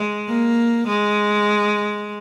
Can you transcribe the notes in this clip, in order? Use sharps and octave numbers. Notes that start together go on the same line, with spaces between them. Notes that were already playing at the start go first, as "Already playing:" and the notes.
Already playing: G#3
A#3
G#3